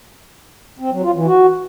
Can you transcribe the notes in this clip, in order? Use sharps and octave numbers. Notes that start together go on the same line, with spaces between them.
C4
F#3
F4
E3
F#4